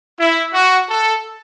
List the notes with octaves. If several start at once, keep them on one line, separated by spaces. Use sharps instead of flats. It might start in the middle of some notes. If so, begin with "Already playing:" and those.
E4
F#4
A4